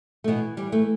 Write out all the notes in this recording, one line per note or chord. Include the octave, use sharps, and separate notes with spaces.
A3
B2 E3 B3
E3 G3
A3